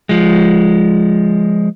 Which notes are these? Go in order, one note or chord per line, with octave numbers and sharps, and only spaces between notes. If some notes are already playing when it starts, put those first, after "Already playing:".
F3 G#3